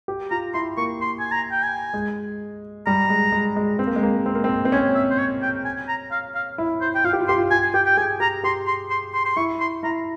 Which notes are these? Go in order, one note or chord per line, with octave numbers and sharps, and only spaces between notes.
G4
F4 A#5
E4 C6
A#3 C#6
C6
G#5
A#5
G5
G#5
G#3
G3 A#5
G#3
G#3
G#3
C4
A#3
G#3
A#3
C4
A#3
C4
C4
C#4 G#5
E5
C5
C#5
G5
G#5
A#5
F5
F5
E4
C5
G5
F4 F5
G4
F4
G4 C6
F4
F4 G#5
G4 G5
G5
G#4 G#5
G4 A#5
G4 C6
C6
C6
C6
C6
E4 C#6
C6
E4 A#5